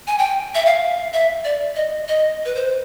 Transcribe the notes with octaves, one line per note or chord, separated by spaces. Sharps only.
G#5
G5
E5
F5
E5
D5
D#5
D#5
B4
C5